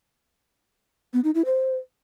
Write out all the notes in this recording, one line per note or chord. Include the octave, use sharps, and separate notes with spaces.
B3
D#4
E4
C5